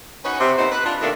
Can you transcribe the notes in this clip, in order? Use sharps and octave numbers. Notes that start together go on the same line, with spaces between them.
C#4 D#4 F#4 B4
C3
A#2 B3 D#4 C5
B4
D4 D#4 F4
B2 D#3 A3 A#3 D4